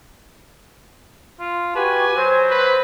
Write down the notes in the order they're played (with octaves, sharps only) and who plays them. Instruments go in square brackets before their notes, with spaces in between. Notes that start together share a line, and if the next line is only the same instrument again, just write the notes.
[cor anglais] F4
[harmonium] F#4 G4 [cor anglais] B4 [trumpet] G#5
[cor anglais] F#3 [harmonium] C5
[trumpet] B4